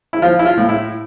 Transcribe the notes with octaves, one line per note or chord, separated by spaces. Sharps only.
E4
F3 F4
E4
F4
A2
E4